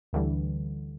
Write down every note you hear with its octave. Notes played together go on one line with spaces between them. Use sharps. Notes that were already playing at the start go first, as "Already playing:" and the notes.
D2 D3 E3 G3